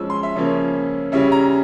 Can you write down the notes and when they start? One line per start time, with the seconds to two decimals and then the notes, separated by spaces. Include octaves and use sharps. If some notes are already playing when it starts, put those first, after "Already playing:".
Already playing: F3 G#3 C#4 E6
0.10 C6
0.23 E5
0.36 C#3 F3 A#3 C#4
1.12 C#3 G3 C#4 E4 E5
1.32 A#5